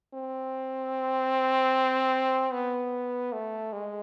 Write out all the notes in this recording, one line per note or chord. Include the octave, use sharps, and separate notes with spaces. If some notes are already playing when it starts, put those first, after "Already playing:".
C4
B3
A3
G#3